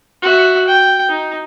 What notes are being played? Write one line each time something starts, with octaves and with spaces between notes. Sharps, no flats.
F#4 E5
G5
D#4